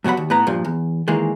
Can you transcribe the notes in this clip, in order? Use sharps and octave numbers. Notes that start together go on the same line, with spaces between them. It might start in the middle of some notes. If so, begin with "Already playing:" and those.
G2 B2 F#3 F#5 B5
D#2
A2 B3 B4 A#5
G2 A#2 F3
E2
D#3 E3 G#3 A#3